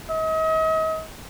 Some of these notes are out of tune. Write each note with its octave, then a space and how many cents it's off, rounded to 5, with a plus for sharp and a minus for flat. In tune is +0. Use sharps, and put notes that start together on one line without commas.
D#5 +40